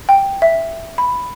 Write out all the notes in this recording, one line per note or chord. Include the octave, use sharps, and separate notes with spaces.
G5
E5
B5